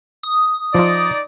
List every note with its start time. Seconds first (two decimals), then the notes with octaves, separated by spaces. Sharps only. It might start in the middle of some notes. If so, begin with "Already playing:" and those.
0.23 D#6
0.75 F3 D#4 F4 D5